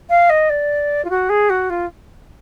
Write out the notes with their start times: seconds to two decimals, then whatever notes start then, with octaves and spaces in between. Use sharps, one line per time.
0.09 F5
0.29 D#5
0.49 D5
1.04 F4
1.09 F#4
1.29 G#4
1.49 F#4
1.69 F4